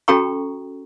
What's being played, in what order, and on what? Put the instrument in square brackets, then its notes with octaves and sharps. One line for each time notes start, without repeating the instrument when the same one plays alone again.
[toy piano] C#4 F#4 A4 G5 A#5 C#6